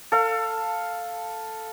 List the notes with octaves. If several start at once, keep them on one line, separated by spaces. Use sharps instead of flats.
A4 F5